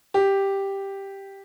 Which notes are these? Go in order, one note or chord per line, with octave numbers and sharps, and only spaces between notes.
G4